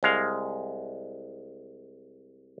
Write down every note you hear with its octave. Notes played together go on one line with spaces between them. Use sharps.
C2 G#3 F5